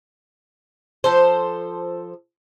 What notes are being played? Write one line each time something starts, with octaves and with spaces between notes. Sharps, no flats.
F3 A4 C5